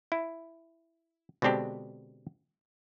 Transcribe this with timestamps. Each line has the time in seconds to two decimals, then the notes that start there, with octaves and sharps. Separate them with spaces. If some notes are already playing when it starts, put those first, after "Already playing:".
0.12 E4
1.42 B2 D3 G#3 C4 D4 G4